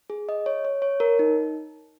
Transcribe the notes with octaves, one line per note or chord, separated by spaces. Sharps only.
G#4
D#5
C#5
C#5
C#5
A#4
D#4